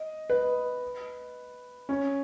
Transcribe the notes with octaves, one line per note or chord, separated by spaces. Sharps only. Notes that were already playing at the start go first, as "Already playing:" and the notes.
Already playing: D#5
B4
C#4